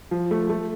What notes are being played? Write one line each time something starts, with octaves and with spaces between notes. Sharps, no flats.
F3
A3
A3